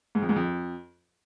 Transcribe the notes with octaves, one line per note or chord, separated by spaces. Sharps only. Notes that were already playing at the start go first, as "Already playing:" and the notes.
G#2
F2
G#2
F2